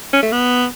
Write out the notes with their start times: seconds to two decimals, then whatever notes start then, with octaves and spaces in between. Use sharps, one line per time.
0.13 C#4
0.22 A3
0.32 B3